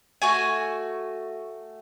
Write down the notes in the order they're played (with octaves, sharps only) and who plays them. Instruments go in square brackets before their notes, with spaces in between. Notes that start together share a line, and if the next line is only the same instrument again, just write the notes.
[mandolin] A3 F#4 G#5